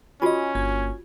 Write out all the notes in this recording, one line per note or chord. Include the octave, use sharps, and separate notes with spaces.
C#4 F4 F#4 D#5 G#5
G1 A#3 G#6